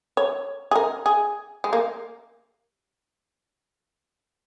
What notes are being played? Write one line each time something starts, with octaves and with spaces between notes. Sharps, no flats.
C#5
G#4
A#4
G#4
G#3
A#3